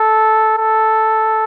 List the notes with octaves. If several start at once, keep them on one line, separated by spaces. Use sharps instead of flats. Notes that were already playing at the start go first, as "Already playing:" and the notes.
Already playing: A4
A4